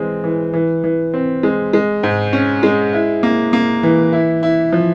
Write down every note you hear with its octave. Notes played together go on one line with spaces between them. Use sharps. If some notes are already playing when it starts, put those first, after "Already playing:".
Already playing: E3 G#3 C4
E3
E3
E3
C4
G#3
G#3
G#2
C#4
G#3
E4
A#3
A#3
E3
E4
E4
F3